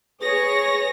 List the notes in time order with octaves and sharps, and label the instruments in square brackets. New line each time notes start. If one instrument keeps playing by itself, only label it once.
[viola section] G#4 [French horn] B4 [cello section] C#5 [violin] A#6